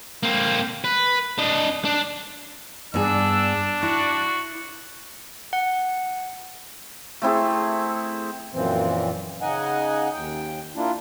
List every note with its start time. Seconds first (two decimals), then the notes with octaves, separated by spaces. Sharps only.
0.23 A#3 C4
0.84 B4
1.38 D4 D#5
1.85 D4
2.94 G2 B3 D4 G#4 E6
3.83 E4 F#4
5.53 F#5
7.22 A3 C4 E4 G#4
8.53 F#2 A#2 E3 F3 C4
9.41 C#3 D#4 D#5 F#5 G#5
10.14 D#2 G5
10.76 A#3 D4 E4 F4